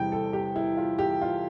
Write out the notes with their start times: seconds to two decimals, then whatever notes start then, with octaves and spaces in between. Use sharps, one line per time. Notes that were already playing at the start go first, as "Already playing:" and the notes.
Already playing: E2 C3 E3 G3 G5
0.12 A4
0.33 G4
0.56 E4
0.77 F4
0.99 G4
1.21 F4